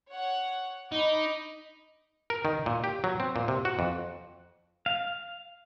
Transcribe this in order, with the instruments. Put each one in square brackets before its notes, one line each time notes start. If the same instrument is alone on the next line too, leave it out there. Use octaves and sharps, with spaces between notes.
[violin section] C#5 F#5
[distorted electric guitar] D#4 [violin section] D#5 B5 D6
[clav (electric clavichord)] A#4
D#3
A#2
G4
F#3
C4
A#2
C3
F#4
F2
[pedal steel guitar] F5